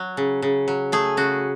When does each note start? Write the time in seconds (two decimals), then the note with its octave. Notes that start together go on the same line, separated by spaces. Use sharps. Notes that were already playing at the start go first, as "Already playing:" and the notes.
Already playing: F#3
0.17 C#3
0.42 C#3
0.68 F#3
0.92 A3 G#4
1.17 C#3 F#4